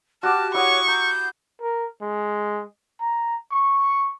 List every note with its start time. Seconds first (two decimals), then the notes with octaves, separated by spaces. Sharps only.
0.23 F#4 G4 A5 F6
0.54 E4 C#5 F#5 C#6 D#6
0.88 A#5 G6
1.61 A#4
2.02 G#3
3.01 A#5
3.52 C#6